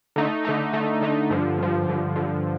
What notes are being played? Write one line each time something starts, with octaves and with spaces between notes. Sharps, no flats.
D3 A3 D#4
D3 A3 D#4
D3 A3 D#4
D3 A3 D#4
G2 D3 F3
G2 D3 F3
G2 D3 F3
G2 D3 F3